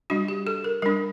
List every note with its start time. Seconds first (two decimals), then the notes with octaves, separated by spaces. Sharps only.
0.10 G3 D4 F#4
0.28 G4
0.47 A4
0.64 A#4
0.82 G3 D4 A#4